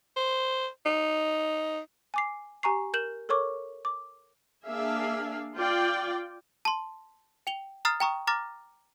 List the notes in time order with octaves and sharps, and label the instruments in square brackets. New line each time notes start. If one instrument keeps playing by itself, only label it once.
[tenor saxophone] C5
D#4
[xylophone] G#5 D6 C7
G4 G#5 A#5 C#6 C7
A#4 G6 E7 F#7
A4 A#4 C#5 C#6 D6
D6
[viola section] A#3 D4 G#4 E5 F5
F4 D5 G5
[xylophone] A5 C6
G5 F7 G7
A#5 D#6 F6 A6 C7
G5 A#5 C#6 D#6
A#5 D6 F6 A6 A#6